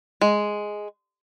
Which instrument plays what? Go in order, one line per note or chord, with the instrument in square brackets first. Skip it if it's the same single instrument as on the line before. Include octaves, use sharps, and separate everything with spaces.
[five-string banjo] G#3